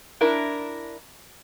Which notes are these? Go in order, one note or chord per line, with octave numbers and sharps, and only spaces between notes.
D4 E4 A#4